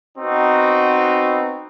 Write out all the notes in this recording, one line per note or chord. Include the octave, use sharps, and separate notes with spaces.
B3 C4 D#4 F#4